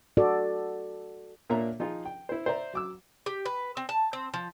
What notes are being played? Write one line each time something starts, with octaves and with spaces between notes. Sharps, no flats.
F#4 A4 D5
A#2 A#3 D4 C#5 E5 A#5
F3 D#4 F4 G#4
G5
E4 C5
C5 D5 E5 A#5
F#3 D6 E6
G4
B4
C4
A5
C4
F3